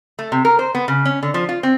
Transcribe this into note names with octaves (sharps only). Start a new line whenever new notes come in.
A3
C3
A#4
C5
B3
C#3
C#4
D3
F3
F4
C4